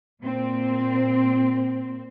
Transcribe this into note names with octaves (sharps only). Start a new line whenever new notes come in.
A#2 C4